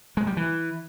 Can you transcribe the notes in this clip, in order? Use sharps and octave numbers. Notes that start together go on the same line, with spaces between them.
G#3
G3
E3